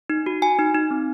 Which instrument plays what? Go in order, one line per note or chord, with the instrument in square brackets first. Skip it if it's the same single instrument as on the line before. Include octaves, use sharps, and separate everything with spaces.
[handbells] D#4
F#4
F#4 G#5
D#4
D#4
C4